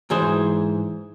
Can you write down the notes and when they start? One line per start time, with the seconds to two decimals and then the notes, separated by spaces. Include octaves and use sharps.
0.10 G#2 E3 G#4 C5